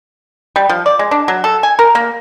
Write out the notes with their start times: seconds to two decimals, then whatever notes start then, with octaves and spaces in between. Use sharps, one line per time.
0.56 G3
0.69 F3
0.86 D5
0.99 G#3
1.11 D4
1.28 F#3
1.44 A4
1.63 G#5
1.79 A#4
1.95 A#3